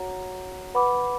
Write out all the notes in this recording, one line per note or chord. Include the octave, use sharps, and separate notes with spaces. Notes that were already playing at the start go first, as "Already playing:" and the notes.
Already playing: F#4 C#5 F#5 A#5
B4 F#5 B5 D6